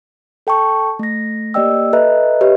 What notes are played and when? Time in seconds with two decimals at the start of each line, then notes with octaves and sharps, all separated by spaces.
0.47 A4 G5 A5 C#6
0.99 A3 A#6
1.54 A#3 G4 D5 D#5 G5 E6
1.93 A4 B4 D#5 E5 A#5 F#6
2.41 G4 B4 C#5 D#5 E5